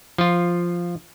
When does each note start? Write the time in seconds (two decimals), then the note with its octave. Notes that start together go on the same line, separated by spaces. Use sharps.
0.18 F3 F4